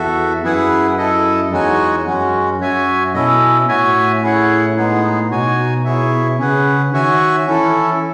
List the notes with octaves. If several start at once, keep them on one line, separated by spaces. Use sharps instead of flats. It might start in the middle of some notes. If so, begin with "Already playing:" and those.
Already playing: E2 F#4 A4 E5
F#2 E4 G#4 B4 F#5
E4 A4 D#5
E2 G#3 D#4 F#4 C#5 G#5
F#2 G#3 C#4 F#4
F#2 F#4 C#5 E5 G#5
B2 C#4 E4 A4 D#5
A2 F#4 C#5 E5 G#5
C#4 E4 G#4 C#5 F#5
G#3 B3 D#4 G#4
B2 D#4 F#4 C#5 G#5
E4 G#4 C#5 E5
C#3 C#4 G#4 B4 F#5
D#3 F#4 C#5 E5 G#5
E3 C#4 E4 A4